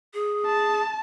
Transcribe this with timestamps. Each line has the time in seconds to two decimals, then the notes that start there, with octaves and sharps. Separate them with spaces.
0.14 G#4
0.46 A5